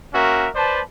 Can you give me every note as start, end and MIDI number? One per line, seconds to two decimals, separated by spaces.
0.13 0.48 58
0.13 0.48 61
0.13 0.48 66
0.13 0.48 70
0.13 0.48 76
0.55 0.81 71
0.55 0.81 72
0.55 0.81 74
0.55 0.81 81